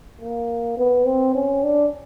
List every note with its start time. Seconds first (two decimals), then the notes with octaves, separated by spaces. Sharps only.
0.22 A#3
0.78 B3
1.06 C4
1.34 C#4
1.63 D4